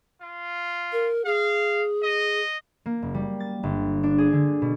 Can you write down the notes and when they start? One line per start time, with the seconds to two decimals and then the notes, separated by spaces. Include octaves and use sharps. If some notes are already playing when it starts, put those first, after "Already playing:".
0.22 F4
0.92 A#4
1.25 G#4 F5
2.03 D#5
2.86 A#3
3.02 F#1
3.14 G3
3.40 A6
3.63 G1
4.03 D4
4.18 G#4
4.33 D3
4.62 B2